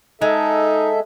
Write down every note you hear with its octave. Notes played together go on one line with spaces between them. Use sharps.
G#3 D#4 A4 E5